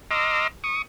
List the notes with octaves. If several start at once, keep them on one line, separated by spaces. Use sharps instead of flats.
D#5 A#5 C6 D6 E6 F6
C#6 D#6